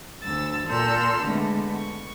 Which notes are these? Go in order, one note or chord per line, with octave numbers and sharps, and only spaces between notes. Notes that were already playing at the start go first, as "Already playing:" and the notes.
D2 E6 A6
A#2 A4 C6 E6 F6 G6
D3 G#3 A3 B3
C#6